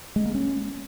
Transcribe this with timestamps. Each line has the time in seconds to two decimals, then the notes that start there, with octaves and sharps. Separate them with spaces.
0.16 G#3
0.25 A#3
0.35 C#4